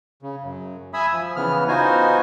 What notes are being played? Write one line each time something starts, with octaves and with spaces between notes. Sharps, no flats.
C#3
F#2
E5 G#5 B5 D#6 E6
F3
C#3 E3 B3 F6
B3 D#4 F4 F#4 C5 G#5